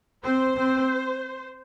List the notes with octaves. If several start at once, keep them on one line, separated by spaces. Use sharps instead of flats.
C4 C5
C4